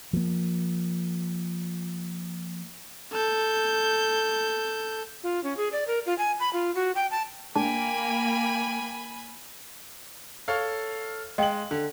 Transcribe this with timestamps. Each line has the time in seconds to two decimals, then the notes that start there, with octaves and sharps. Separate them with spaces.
0.13 F3 A#3
3.13 A4 G6
5.24 F4
5.44 C#4
5.57 G#4
5.72 D5
5.87 A#4
6.06 F4
6.19 G#5
6.40 B5
6.53 F4
6.75 F#4
6.95 G5
7.11 A5
7.56 A2 A#3 D4 G5 G#5 B5
10.48 A4 C#5 F5
11.38 G#3 D#5 F5 G5 F#7
11.71 D3